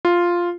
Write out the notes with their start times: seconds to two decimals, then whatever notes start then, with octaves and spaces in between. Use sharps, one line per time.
0.05 F4